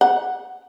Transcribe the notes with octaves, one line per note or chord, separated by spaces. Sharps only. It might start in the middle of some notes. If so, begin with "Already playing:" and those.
F#5